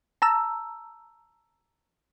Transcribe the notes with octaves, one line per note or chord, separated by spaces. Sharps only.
A5 A#5 E6